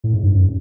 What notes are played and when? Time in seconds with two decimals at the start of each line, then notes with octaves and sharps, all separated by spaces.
0.04 A2
0.13 G#2
0.23 G2
0.34 F#2